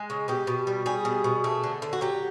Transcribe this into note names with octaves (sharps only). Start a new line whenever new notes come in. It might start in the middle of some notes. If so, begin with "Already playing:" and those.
Already playing: G#3
C#3
B2 G4
B2
G3
G3 G#4
B2
B2
A3
D3
D3
F#4
F#3 G4